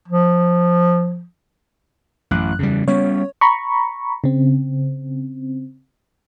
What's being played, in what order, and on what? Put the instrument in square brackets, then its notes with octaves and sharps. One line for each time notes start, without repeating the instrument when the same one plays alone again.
[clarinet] F3
[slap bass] A1 [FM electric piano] F#2 F#6
[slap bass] E2 G3 [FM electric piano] C#3
[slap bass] G3 B3 C#4 [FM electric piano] C#5
[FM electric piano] A#5 B5 C#6
C#3 C4